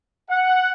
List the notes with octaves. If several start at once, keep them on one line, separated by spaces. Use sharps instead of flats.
F#5